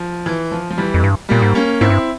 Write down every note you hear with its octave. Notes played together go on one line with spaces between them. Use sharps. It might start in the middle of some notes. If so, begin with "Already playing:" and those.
Already playing: F3
E3
F3
F3
E3 G3
F2
G2
A#2 G3 A#3
G#2
A#3 C#4
G#2 C4 E4
G2